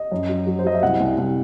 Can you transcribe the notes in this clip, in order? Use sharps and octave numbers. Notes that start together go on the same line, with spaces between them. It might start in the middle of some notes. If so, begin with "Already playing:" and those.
Already playing: D#5
F#2
F#3
F#3
C5
F#3 D#5
E5
C2 F#5
C2
C2